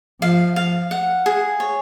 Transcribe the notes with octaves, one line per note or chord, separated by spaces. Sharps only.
F3 F5
F5
F#5
G#4
C#5